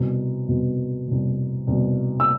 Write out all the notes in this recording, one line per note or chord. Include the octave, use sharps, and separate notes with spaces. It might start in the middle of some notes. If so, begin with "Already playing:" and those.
Already playing: C2 B2
C2 B2
C2 B2
C2 B2
E6